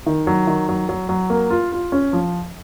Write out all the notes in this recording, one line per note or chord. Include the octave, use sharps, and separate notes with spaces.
D#3
F#3
D#3
F#3
F#3
F#3
A#3
F4
F4
C#4
F3